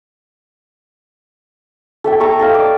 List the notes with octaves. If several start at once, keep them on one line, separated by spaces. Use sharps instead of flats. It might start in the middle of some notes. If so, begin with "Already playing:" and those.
A4 E5 G5
A4 A#5 C#6
A4 D#5 F5
D5